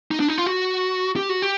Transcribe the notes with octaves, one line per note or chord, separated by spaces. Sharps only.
D#4
D4
D#4
F4
F#4
G4
F#4
G4